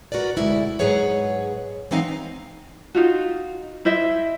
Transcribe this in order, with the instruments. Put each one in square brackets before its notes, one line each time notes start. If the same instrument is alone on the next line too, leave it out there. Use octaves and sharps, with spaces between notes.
[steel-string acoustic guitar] F#4 A#4 B4 D5
D2 B2 G#3 E4 D5
G#2 F#3 G#4 B4 C#5 F#5
E3 B3 C4 D#4 F5 G#5
[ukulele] D#4 F4 F#4
E4 C5 D#5 E5